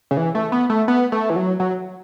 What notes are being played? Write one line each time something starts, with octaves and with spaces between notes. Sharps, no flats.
C#3
E3
A3
B3
A3
B3
A3
E3
F#3
F#3